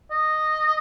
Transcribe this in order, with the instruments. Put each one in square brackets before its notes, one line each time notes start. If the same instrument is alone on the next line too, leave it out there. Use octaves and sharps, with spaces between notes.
[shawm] D#5